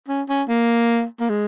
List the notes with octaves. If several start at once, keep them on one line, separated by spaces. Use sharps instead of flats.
C#4
C#4
A#3
A#3
G#3